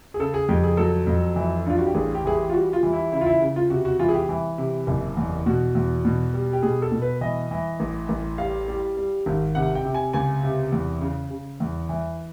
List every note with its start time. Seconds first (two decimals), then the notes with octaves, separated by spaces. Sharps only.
0.14 G#4
0.19 C#3 A4
0.34 G#4
0.49 F2 G4
0.64 G#4
0.77 F#3 A4
1.07 F2
1.36 E3
1.66 G2 F4
1.78 F#4
1.87 G4
1.95 A1 G#4
2.15 G4
2.24 E3 G#4
2.34 G4
2.50 F4
2.53 G3 F#4
2.73 F4
2.83 E3
2.93 E4
3.12 C#3 E4
3.21 F4
3.26 E4
3.41 C#3
3.56 F4
3.70 C3 F#4
3.85 F#4
3.99 E3 F4
4.08 G#4
4.14 G4
4.29 E3
4.58 C3
4.87 F#1
5.17 E2
5.46 B2 F#4
5.75 E2
6.05 B2
6.34 G3
6.53 G4
6.63 B2 G#4
6.82 A4
6.92 B2
7.02 B4
7.21 E3 D#5
7.51 E3
7.80 A1
8.09 A1
8.38 G3 F5
8.68 G3
8.97 G3
9.26 G#1
9.55 C3 F#5
9.75 G5
9.85 C3
9.94 G#5
10.13 C#2 G#5
10.43 C3
10.72 E2
11.01 C#3
11.31 C#3
11.60 E2
11.89 E3